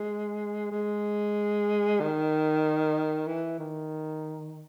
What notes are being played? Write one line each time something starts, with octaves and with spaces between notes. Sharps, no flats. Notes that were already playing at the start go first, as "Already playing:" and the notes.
Already playing: G#3
G#3
D#3
E3
D#3